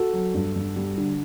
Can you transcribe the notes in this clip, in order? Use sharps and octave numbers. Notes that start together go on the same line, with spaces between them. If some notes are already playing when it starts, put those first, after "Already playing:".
Already playing: F#4 A4
F#3
G2
G2
G3
D3